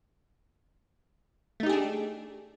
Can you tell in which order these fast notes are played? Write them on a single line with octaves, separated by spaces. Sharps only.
A3 D#4 G4 G#4 D4